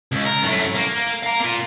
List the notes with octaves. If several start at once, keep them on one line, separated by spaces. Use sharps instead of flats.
C#2
A#4
F#2 A2
A#3
F5 A#5
A#3 F4